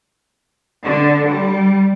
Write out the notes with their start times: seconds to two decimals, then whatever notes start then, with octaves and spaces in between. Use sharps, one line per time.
0.85 D3
1.29 G3